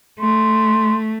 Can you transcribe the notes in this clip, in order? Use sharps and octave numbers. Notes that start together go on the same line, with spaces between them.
A3 C6